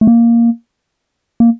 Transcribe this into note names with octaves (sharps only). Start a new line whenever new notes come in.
A3
A#3
A#3